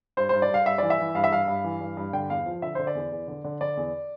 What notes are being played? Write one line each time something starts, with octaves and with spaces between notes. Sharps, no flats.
G2 C5
G2 C5
D5
G2 F5
G2 E5
E3 D5
E5
E3
G2 F5
E5
G2 F5
G2
E3
G2
G2
D3 G5
E2 F5
F3
D3 E5
D3 C5
D5
E2
E2
D3
D3
D3 D5
E2